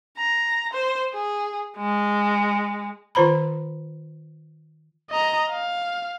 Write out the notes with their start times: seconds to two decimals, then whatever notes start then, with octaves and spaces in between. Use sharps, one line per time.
0.18 A#5
0.73 C5
1.14 G#4
1.77 G#3
3.15 D#3 F4 C5 A#5 B5
5.10 D#5 A#5
5.50 F5